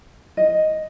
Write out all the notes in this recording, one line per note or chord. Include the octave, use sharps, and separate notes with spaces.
D#5